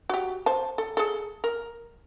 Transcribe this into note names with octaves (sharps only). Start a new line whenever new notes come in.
F#4 G4
C5 A5
A4
G#4 A4
A#4